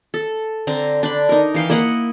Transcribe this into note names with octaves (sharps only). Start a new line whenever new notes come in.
A4
D3 C4 A#5
D4 B5
D#4 A#4
E3 F5 G5
A#3 E4 D#5 F#5